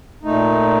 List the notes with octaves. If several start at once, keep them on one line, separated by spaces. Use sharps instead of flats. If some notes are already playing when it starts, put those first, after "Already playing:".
A#2 A3 D#4